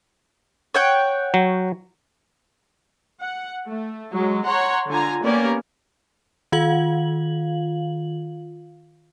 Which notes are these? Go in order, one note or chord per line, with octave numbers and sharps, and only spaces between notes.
C#5 F#5 G5
F#3
F#5
A3
F#3 G#3
C#5 F#5 A#5 C6
D3 F4 G#5 A#5
A#3 B3 C#4 G4 A#4 D5
D#3 F4 F5 F#7